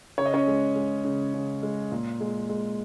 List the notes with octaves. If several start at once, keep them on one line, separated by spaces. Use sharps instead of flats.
C#3 C#5
D#5
C#4 C#5
G#3
G#3
C#3
C#3
G#3
A#2
G#3
G#3